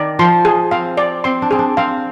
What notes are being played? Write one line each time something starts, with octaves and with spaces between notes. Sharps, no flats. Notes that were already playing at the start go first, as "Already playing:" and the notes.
Already playing: D#3 D5
F3 C6
G#4
C4 F5
D5
C4 C6
D4
C4 G#4
D4
C4 F5